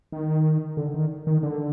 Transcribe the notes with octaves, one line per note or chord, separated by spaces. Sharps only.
D#3
D3
D#3
D#3
D3